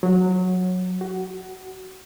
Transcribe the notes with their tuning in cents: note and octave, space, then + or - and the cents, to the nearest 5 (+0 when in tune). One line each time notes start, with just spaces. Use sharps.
F#3 -15
F#4 +20